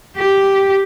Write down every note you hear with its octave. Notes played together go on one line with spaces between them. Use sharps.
G4